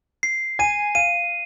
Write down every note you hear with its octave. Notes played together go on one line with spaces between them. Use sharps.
C7
G#5 D#7
F5 D#7